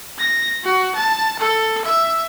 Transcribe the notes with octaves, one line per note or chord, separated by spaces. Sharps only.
A#6
F#4
A5
A4
E5